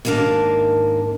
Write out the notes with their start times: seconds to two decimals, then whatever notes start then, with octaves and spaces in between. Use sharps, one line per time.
0.05 D#2 G#2 A#3 D4 A#4 A5